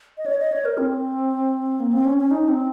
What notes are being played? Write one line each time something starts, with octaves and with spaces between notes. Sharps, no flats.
D#5
C#5
D#5
C#5
A#4
C4
A#3
C4
C#4
C#4
D#4
C4